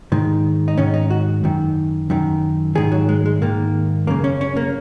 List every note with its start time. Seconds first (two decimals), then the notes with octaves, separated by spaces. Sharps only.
0.12 G#2 D#3
0.68 D#4
0.77 G#2 D#3 C#4
0.94 D#4
1.10 F#4
1.44 F#2 D#3
2.10 F#2 D#3
2.75 G#2 D#3 G#4
2.92 F#3
3.09 G#3
3.26 G#3
3.42 G#2 D#3 A#3
4.07 F#2 C#3 A#3
4.24 C#4
4.41 C#4
4.57 A#3